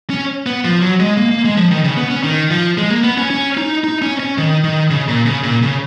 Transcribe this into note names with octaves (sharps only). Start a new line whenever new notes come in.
C#4
B3
F3
F#3
G#3
A#3
A#3
G#3
F3
D#3
C#3
B3
C#4
D#3
F3
G#3
A#3
B3
C#4
C#4
D#4
D#4
C#4
C#4
D#3
D#3
C#3
A#2
C#3
A#2
C#3